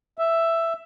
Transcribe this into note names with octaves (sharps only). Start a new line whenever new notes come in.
E5